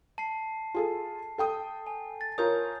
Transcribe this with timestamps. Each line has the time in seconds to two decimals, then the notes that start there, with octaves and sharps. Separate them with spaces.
0.18 A5 C7
0.74 F4 G#4 A4
1.38 A4 G5 D#6
1.87 G#5
2.21 A6
2.38 F4 A#4 C#5 D#6 G6